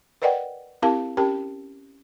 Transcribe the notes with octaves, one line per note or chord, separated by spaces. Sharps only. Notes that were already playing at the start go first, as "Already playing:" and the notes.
A#4 B4 D5 D#5 F#5 G5
C4 E4 G4 A#4 F5 A5
C#4 G4 A#4 G5 A5